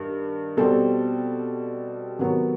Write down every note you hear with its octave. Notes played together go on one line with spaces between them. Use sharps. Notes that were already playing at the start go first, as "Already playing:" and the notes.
Already playing: G2 D#3
B2 G3 C4 A4
C3 D#3 F#3 B3